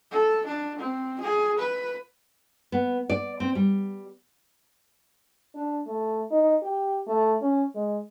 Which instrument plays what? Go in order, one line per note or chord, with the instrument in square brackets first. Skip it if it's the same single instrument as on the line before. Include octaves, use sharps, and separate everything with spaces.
[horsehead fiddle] A4
D4
C4
G#4
B4
[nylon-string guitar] B3
D5
C4
G3
[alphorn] D4
A3
D#4
G4
A3
C#4
G#3